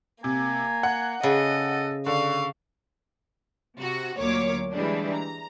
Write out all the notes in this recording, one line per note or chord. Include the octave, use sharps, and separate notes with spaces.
C3 A#3 G#5
F#5
C#3 A4 D#5
D3 F5 C#6
C3 F#4
D2 A#2 F#3 A#3 C#5 D6
E3 G3 G#3 D4
A#5